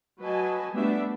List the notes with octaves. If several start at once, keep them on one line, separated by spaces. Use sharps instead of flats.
F#3 B4 D#5 G#5 A5
G3 A3 B3 D4 F#4 E5